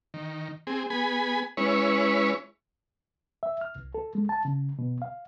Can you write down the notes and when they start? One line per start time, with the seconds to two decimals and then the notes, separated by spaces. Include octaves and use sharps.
0.14 D#3
0.67 C4 G#4
0.90 B3 G#4 G#5 B5
1.57 G#3 C#4 E4 B4 C#5
3.43 E5
3.61 F6
3.76 C2
3.94 A4
4.15 G#3
4.29 A5
4.45 C#3
4.79 B2
5.02 F5